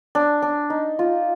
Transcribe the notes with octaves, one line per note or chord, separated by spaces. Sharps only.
D4
D4
D#4
F4